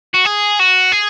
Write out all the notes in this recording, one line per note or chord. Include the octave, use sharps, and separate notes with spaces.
F#4
G#4
F#4
G#4